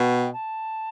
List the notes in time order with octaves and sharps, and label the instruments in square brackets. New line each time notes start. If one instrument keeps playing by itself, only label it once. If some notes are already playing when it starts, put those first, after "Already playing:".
Already playing: [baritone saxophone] B2 [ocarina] G5
[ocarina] A5